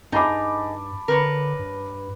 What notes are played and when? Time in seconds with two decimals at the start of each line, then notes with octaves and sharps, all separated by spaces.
0.12 G2 D#4 G#4 A5 B5 D6
1.08 D3 A#4 B4 C#5
1.59 G2